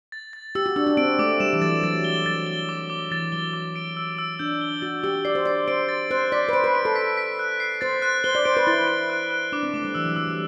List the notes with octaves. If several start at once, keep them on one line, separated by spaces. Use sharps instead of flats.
A6
A6
G4 E6
F#4
D4 E6
D4
C4 D7
A3 D6
G3 E7
E3
F#3 A6
F#3 A6
G7
F#3 A6
G7
D6
D6
E3 A6
F#3 G7
D6
D7
E6
E6
D4 G6
G7
F#4 A6
G4 E6
D5 C7
C5
D5 C7
C5 D7
A6
C5 F#6
D5 B6
B4
C5 D7
B4
D7
A4
B6
B6
F#6
C7
C5 A6
F#6
C5 G7
D5
C5 D7
B4
E4 A6
D7
F#6
F#6
D4 D6
C4
A3 D6
G3
E3 E6
F#3
G3 E6
G3